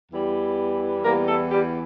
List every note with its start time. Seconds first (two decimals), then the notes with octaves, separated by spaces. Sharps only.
0.11 E2 E3 G3
1.04 E2 E3 G3 A#3 A#4
1.28 A3 A4
1.51 G3 G4